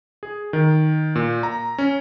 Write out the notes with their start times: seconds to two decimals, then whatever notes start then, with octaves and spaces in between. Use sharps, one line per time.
0.23 G#4
0.53 D#3
1.15 A#2
1.43 A#5
1.78 C#4